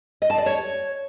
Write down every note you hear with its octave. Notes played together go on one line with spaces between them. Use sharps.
D#5
A5
D5
C#5